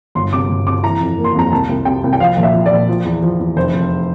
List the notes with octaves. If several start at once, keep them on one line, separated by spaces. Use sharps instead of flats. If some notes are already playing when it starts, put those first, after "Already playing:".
G1 C6
C3 D6
G1
C3 D6
E3 A#5
F2
A#3
C6
F2 A#5
C2 A5
C2
C3 G5
C2
G5
F3 F5
A#1
E5
F3
D5
A#1
F3
E2
F3
E2
F1 C5
F1